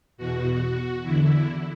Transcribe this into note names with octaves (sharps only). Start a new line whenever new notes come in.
E2 B2 F#4
E2 D3 E4